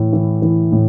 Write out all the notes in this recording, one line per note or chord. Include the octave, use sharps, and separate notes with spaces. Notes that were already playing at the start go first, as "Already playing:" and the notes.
Already playing: A2 E3
E3
E3
A2